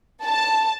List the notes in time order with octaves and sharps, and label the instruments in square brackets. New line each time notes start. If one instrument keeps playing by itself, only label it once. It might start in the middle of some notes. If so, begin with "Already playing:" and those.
[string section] A5